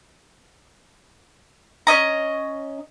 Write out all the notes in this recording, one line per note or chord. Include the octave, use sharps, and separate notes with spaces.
C#4 D#5 A#5